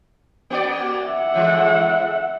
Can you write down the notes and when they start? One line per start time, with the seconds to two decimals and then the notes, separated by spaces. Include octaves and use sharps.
0.50 A#3 F#4 D5
1.04 E5 F#5
1.34 A2 E3 G#3